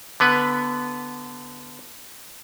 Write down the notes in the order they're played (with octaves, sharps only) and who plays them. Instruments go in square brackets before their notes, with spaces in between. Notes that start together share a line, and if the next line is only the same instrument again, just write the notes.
[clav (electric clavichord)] D3 B3 B4